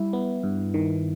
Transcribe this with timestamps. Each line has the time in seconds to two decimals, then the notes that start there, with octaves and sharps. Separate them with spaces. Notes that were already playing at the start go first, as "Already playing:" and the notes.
Already playing: G3 E4
0.13 B3
0.43 G2
0.74 D#3